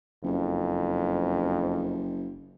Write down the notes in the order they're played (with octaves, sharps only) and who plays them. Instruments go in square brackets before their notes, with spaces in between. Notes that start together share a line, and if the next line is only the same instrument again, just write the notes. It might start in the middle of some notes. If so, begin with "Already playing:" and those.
[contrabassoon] F#1 [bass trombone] F2